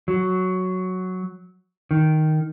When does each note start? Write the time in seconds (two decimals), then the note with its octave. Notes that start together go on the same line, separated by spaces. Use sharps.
0.08 F#3
1.91 D#3